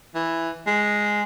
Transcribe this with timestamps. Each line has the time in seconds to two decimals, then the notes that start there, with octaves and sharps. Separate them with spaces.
0.15 E3
0.67 G#3